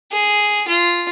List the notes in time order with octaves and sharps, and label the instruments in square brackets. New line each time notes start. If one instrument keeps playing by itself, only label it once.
[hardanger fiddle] G#4
F4